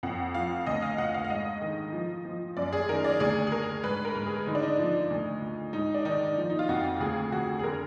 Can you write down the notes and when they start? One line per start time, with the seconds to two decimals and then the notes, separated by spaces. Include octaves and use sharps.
0.03 F2 F#5
0.34 F3 F5
0.66 D2 D#5
0.82 F5
0.98 D2 F#5
1.10 F#5
1.14 F5
1.24 F5
1.30 G#2 D#5
1.61 D#3
1.93 F3
2.25 F3
2.57 F#2 D5
2.73 G#4
2.88 D#3 A#4
3.04 D5
3.20 D2 G#4
3.47 G#4
3.52 D2 A#4
3.83 G#2 B4
4.05 A#4
4.15 G#2
4.26 G#4
4.47 D3 D#4
4.55 D4
4.63 D#4
4.79 F3
5.10 D2
5.42 D2
5.73 G#2 D#4
5.94 D4
6.05 D#3 D#4
6.38 F3
6.50 D#4
6.59 F4
6.69 F2 F#4
7.00 D2 G#4
7.32 D2 F#4
7.59 G#4
7.63 D3 A#4